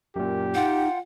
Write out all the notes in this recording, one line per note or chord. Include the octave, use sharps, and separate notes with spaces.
F#2 A#2 G4
D#4 F4 F#5 G5